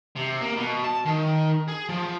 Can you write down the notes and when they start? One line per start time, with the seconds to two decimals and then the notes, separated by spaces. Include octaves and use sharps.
0.16 C3
0.41 A#3
0.56 B2
0.84 A5
1.06 D#3
1.68 G#4
1.89 F3